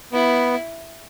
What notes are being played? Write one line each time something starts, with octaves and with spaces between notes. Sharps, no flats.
B3 E4